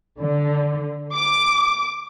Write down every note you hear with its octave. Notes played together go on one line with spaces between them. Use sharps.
D3
D6